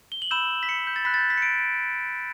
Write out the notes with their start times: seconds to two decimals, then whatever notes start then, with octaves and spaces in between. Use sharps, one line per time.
0.12 G7
0.22 F#7
0.31 B5 E6 G6 E7
0.63 B6
0.69 C#7
0.87 G6
0.96 A6
1.05 B5 F#6 B6
1.14 A6
1.18 G6
1.30 B6
1.37 C#7
1.42 D7